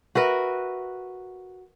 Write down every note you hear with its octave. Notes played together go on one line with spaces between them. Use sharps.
F#4 A#4 B4 E5